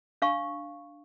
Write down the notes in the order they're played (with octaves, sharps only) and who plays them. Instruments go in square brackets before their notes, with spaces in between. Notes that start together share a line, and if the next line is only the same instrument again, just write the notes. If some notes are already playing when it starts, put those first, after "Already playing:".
[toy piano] D4 F5 C#6